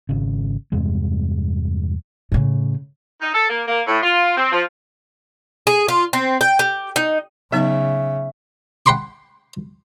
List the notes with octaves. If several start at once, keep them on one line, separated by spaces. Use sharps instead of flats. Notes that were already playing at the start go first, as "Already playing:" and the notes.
G#1 C#3
E2 G2 C3 G#3
A2 C#3
D#4
A4
A#3
A#3
A2
F4
C4
F3
G#4
F4
C4
G5
G4
D#4
C#3 F#3 B3 D#4 E5
F#5 G5 B5 C6 D6